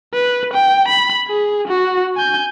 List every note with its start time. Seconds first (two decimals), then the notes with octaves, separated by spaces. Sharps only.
0.14 B4
0.54 G5
0.88 B5
1.28 G#4
1.68 F#4
2.17 G#5 G6